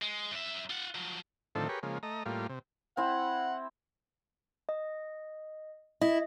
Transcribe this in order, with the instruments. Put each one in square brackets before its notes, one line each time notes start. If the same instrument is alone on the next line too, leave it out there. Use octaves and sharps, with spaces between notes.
[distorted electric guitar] G#3
F#2 E5
F4 F#5
F3 F#3
[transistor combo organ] A2 D3 D#3 F3 C4 A4
G4 G#4 A#4 B4 C#5
C#3 F3 G#3 A#3
A3 D#5 A#5
A2 G3 A#3 F4
C3
[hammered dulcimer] C4 E4 [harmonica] F#5
[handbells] D#5
[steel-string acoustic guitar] E4 [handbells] D#5